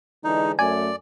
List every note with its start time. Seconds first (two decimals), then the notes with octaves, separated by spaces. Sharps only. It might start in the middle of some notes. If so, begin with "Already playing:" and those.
0.24 D3 E3 G#3 D#4
0.59 F#2 A3 D5 G#5